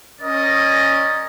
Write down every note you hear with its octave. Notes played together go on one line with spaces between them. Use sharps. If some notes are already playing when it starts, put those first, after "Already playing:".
C#4 A#4 D5 D#5